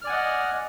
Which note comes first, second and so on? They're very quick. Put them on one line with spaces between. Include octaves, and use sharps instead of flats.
F6 D5 G#5 F#5 D#5